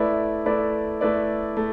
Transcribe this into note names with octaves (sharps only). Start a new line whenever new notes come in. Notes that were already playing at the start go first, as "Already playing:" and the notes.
Already playing: A3 E4 B4 D5
A3 E4 B4 D5
A3 E4 B4 D5
A3